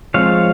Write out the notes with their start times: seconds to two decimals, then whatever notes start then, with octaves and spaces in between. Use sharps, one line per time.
0.14 F3 G#3 C4 C#5 F5